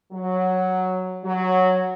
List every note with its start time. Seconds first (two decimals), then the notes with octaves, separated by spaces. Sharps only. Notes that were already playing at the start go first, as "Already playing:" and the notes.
0.13 F#3
1.24 F#3